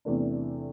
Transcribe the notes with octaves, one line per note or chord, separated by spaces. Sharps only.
E2 C3 E3 A3 D4